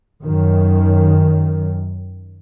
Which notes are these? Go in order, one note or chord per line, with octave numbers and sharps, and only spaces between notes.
F#2 D#3